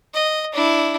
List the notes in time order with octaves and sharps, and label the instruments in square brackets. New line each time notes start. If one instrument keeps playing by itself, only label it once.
[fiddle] D#5
D4 E4